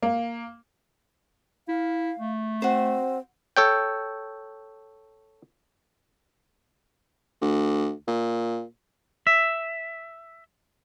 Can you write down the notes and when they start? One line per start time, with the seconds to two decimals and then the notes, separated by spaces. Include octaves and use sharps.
0.02 A#3
1.68 E4 F5
2.19 A3
2.62 C4 F#4 C5
3.57 A4 C#5 G5
7.42 D2
8.07 A#2
9.27 E5